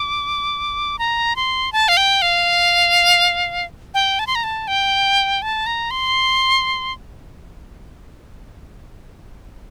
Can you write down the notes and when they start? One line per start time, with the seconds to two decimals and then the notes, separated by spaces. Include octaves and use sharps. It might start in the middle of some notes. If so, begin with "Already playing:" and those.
Already playing: D6
0.99 A#5
1.36 C6
1.73 A5
1.88 F5
1.97 G5
2.22 F5
3.94 G5
4.19 A5
4.27 C6
4.35 A#5
4.44 A5
4.68 G5
5.42 A5
5.66 A#5
5.91 C6